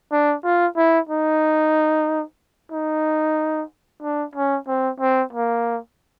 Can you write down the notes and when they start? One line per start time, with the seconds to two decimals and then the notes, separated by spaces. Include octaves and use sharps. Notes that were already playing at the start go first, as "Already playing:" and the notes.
0.12 D4
0.44 F4
0.77 E4
1.09 D#4
2.72 D#4
4.03 D4
4.36 C#4
4.68 C4
5.01 C4
5.33 A#3